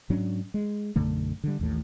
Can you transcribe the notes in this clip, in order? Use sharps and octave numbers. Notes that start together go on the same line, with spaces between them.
G#2 F#3 C#4 D4
G#3
B1 F#2 D3 A3
D3 G3
A1 D#2 A2